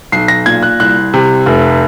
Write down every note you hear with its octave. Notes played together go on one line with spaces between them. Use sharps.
B1 C7
A#6
A#2 G#6
F#6
C2 F#6
C3
F1